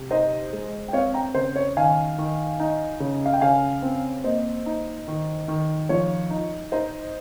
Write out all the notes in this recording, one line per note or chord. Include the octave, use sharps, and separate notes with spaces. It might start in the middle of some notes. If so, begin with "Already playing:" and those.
Already playing: C3
D#4 C5 D#5
G#3
G5
C4 C#5 F5
G5 A#5
C#3 C5
C#5
D#3 F5 G#5
D#3
D#4
C#3
F5
G5
C#3 F5 G#5
C4
A#3 C5 D#5
D#4
D#3
D#3
F3 C#5
D#4
D#4 C5 D#5